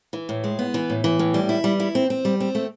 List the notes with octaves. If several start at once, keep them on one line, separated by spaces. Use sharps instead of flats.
E3
A2
G#3
B3
E3
A2
E3
A2
G3
E4
G3
E4
C4
C4
G3
C4
A3